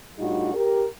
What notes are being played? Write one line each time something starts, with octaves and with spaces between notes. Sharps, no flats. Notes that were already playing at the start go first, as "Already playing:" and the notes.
A2 G3 D4 D#4 F4 F#4
G4 A#4